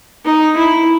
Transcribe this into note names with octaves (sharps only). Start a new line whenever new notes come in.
D#4
E4